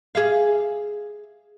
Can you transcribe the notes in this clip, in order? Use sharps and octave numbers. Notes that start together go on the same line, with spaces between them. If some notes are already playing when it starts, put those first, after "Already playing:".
G#4 E5 F5